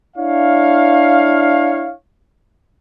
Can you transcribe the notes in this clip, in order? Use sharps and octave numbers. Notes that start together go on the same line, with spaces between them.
D4 E4 C#5 F5